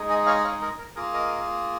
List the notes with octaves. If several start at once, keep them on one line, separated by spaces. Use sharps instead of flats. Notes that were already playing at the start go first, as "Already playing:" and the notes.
Already playing: G#3 D#4 G#4
D#5 G#5
C#5 F5
C#5 F5
A#4
A#4
A#3 F4 G#4 A#4
A#4 D#5